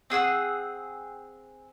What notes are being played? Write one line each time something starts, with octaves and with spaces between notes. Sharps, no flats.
C4 G#4 F#5 E6